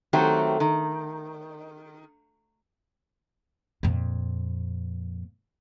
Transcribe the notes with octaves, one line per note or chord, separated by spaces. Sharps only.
D#3 F#3 A3 C4 F#4 G4
D#3
F2 A#2